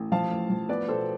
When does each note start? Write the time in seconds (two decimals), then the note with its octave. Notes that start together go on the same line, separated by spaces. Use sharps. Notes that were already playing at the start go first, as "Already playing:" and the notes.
Already playing: A1
0.12 F3 F5 A5
0.31 A1
0.50 F3
0.69 B3 B4 D5
0.88 B2 A4 C5